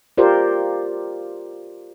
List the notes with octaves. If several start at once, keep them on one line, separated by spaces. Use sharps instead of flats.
F4 G4 A#4 C5 D5